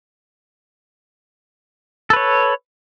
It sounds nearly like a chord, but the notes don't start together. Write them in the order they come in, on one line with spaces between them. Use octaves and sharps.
A4 B4 C#5